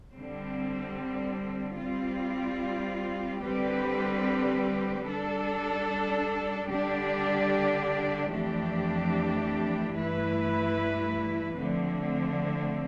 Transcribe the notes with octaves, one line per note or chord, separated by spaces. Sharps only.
D3 G3 C4
G3 C4 F4
D3 G3 C4 G4 B4
G3 D4 A4
D3 G3 D4 G4 D5
F2 E3 A3 D4 G4
G2 E3 A3 E4 B4
D3 F3 A3 C4